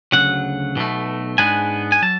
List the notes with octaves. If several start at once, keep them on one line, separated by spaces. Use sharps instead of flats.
D2 C#3 F#3 F#5
B1 B2 A3
G#2 G#3 B3 D4 G#5
G#5
F#3 A5